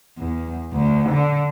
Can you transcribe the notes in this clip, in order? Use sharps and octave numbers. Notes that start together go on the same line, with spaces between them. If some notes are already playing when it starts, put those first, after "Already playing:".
E2
D2
D3